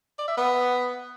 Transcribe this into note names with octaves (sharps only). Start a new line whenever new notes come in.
D5
E5
B3